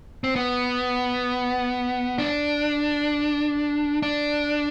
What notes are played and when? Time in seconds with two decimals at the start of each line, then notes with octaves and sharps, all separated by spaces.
0.24 C4
0.36 B3
2.18 D4
4.02 D4